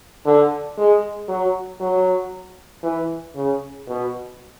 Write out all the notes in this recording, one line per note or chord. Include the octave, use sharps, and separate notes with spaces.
D3
G#3
F#3
F#3
E3
C#3
B2